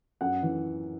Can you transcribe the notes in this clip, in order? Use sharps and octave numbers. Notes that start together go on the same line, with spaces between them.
F#2 F#5
E3